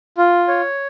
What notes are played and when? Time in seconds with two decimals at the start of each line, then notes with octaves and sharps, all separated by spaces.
0.18 F4
0.48 C#5